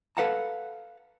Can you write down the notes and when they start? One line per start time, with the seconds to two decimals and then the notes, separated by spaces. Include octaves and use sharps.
0.17 A4 B4 F5 F#5 A5 A#5